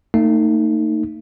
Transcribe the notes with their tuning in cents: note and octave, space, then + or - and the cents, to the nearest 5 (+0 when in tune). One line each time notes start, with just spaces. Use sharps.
A3 +40 D#4 +0